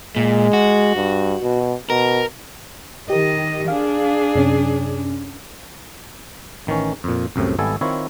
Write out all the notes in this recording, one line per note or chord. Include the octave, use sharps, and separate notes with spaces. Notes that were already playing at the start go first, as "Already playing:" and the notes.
A#2 G#3
F#4
G2
B2
B2 A#4
D#3 G4 A#4 D#5
D4 G#4 F5
F#2 C3 C#4
A1 D#3 E3 C#4
F2 A#2
C2 F#2 A2 C3
G#1 G3 B3 E4 A4 G#5
D#3 C4 E4 F4 C#5